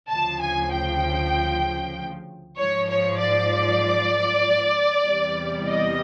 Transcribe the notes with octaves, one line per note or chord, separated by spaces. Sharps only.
D2 C#3 F3 A5
G#5
G5
G#2 F3 C#5
C#5
D5
E2 C3 E3 G3
D#5